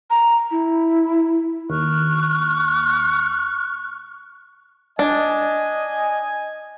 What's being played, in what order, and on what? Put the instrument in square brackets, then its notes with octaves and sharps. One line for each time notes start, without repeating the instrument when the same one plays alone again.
[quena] A#5
E4
[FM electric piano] D#2 [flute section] C#6 F6 F#6
[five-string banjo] D4 [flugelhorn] D#5 [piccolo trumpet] G#5